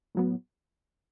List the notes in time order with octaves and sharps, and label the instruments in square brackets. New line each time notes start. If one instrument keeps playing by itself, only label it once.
[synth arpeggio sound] A2 F#3 B3